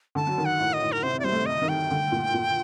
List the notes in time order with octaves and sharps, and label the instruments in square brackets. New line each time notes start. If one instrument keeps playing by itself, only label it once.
[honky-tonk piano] D3 [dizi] A5
[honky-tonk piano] F#3
D#3
[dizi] F#5
[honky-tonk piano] A2
[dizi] D#5
[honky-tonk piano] A2
[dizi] A#4
[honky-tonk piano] C3 [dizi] C5
[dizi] D5
[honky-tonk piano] G3 [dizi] C5
[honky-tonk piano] A3
[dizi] D#5
[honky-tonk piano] D#3
[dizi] G5
[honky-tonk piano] D3
A#2
A#2